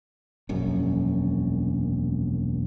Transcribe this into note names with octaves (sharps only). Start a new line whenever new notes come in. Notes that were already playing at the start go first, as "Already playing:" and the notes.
E1 A#1 F#2